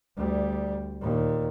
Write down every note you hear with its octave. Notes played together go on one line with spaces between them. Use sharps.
D2 G3
D#2 A#2